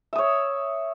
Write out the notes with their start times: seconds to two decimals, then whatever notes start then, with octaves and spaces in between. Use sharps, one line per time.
0.13 E5
0.15 D#6
0.18 C#5